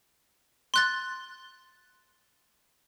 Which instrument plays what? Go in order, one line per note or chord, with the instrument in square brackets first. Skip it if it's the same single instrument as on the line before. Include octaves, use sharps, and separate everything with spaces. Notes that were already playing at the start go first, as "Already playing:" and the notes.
[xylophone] C6 F#6 A6